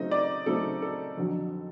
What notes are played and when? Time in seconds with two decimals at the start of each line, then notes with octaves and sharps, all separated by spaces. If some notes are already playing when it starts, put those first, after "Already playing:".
Already playing: C#3 F#3 A3 C4 D#4 D#5
0.11 D5
0.46 C#3 F#3 A3 C4 D#4 A4
0.82 A4
1.17 F2 D3 F#3